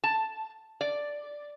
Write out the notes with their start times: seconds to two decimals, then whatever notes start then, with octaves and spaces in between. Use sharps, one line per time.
0.04 A5
0.81 D5